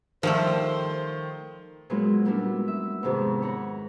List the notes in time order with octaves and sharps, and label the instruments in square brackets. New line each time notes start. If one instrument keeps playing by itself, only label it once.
[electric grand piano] D#3 [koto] F3 G3 A3 [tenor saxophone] C5
[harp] A#2 F#3 G#3 B3 E4 F4
G3 A#3 B3 C#4 D4 E4
E5
F2 G#2 C3 D#3 B3
C#5 F#5 A#5 B5